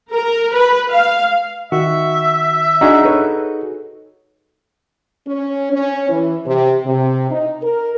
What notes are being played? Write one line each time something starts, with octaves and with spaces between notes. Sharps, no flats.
A#4
B4
F5
D#3 F#4 E5
D4 D#4 F#4 G#4
A4 B4 C#5
C#4
C#4
E3
C3
C3
D#4
A#4